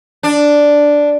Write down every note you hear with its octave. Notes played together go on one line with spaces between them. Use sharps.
D4